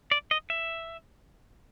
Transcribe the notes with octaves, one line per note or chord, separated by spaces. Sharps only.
D5
D#5
E5